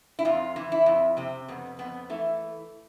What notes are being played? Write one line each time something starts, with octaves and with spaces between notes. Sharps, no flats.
E4
F2 F4
E3
E4
F2
C3 C4
F2 B3
F2 B3
E3 A3